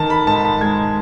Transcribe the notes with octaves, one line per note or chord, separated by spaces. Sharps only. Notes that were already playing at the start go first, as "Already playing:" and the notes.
Already playing: D#3 A5
B5
G#2 A5
A5
G#3 G#6